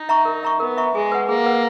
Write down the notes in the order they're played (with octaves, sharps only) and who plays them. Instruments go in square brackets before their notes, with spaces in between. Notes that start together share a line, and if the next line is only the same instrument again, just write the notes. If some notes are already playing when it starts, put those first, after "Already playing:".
Already playing: [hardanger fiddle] D#4
[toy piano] E5 A#5 C#6
A#4
E5 A#5 C#6
[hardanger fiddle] B3 [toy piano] A#4
[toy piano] E5 A#5 C#6
[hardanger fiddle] G#3 [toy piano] G#4
[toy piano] B4 F#5
[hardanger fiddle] A#3 [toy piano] G#4
[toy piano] B4 F#5